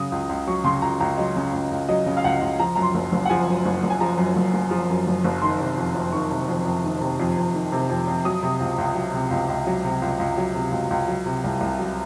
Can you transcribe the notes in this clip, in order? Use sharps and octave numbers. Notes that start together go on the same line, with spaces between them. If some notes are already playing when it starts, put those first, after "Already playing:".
Already playing: C#3 F#3 D#6
C#2
C#2
F#3 C#6
C#3 C6
C#2 A#5
C#2 A#5
F#3 D#5
C#3
C#2
C#2
F#3 D#5
C#3
F5
C#2 F#5
C#2
F3 A#5
F#2 A#5
C6
F#1
F#1
F#5
F3 G#5
F#2
F#1
F#1
G#5
F3 A#5
F#2
F#1
F#1
F3
F#2
F#1
F#1
D#3 C6
C3
F2
F2
D#3 C#6
C3
F2
F2
D#3
C3
F2
F2
D#3
C3
F2
F2
F#3 D#6
C3
C#2
C#2
F#3
C3
C#2
C#2
F#3
C3
C#2
C#2
F#3
C3
C#2
C#2
F#3
C3
C2
C2
F#3